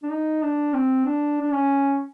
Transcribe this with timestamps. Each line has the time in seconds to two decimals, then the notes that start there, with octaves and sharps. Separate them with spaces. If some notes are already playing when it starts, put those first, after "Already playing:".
0.03 D4
0.11 D#4
0.43 D4
0.73 C4
1.05 D4
1.41 D4
1.53 C#4